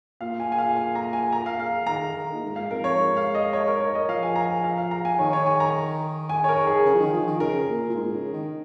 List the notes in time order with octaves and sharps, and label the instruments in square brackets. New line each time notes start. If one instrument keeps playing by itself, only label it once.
[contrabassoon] A#2 [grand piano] F5
[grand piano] G#5
G#5
F5
G#5
A#5
G#5
A#5
F5
F5
[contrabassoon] D#3 [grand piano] A#5
[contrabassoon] D#3
A#2
G#2
[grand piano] F5
[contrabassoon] F2 [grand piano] A#4
[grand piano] C#5
[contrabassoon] G#2
[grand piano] F5
D#5
C#5
A#4
C#5
D#5
[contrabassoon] F3 [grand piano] F5
[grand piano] G#5
A#5
G#5
F5
F5
A#5
G#5
[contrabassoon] D#3 [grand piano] C#5
[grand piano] C#5
G#5
A#5
G#5
C#5
A#4
G#4
[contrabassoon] C#3
F3
D#3
F3
D#3
[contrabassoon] C#3 [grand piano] A#4
[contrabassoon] A#2
A#2
G#2
C#3
D#3